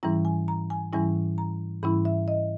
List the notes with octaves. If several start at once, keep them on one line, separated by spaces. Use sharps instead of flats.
G#2 E3 G3 C#4 E4 A#5
G#5
A#5
G#5
G#2 E3 G3 C#4 E4 G#5
A#5
G#2 E3 G3 C#4 E4 B5
E5
D#5